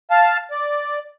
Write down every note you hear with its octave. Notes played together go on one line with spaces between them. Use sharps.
F5 A5
D5